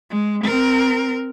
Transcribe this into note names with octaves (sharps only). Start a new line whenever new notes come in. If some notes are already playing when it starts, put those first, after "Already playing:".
G#3
C4 A#4